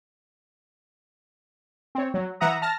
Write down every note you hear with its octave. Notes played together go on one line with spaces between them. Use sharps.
C4 C#5
F#3
E3 E5 F#5 A#5 D#6
A5 F6 A#6